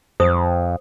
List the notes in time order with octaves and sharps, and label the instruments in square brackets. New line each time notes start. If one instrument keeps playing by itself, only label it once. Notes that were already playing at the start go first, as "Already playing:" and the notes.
[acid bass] F2 [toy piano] C5 D#6